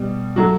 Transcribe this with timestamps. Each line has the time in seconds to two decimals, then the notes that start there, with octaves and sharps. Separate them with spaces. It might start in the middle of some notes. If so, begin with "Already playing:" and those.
Already playing: B2 G3
0.36 F#3 A3 F#4